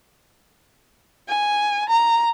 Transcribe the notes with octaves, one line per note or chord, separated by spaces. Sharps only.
G#5
A#5